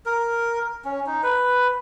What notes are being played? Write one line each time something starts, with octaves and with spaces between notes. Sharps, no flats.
A#4
C#4
D#4
B4